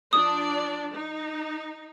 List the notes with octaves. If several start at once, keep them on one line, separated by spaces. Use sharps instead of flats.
F3 D4 D5 D#6
D#4